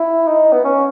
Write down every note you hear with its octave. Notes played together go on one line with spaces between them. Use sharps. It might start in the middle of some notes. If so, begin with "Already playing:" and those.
Already playing: E4
D#4
B3
C#4